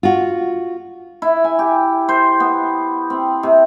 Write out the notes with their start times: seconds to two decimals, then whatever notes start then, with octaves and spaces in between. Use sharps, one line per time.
0.03 F4 F#4
1.22 E4
1.44 G#5
1.59 G4
2.09 C5
2.40 B3
3.10 C4
3.43 C3